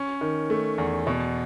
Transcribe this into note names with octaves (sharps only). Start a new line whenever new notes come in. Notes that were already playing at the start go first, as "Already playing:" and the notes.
Already playing: C#4
D#3
A3
E2
B2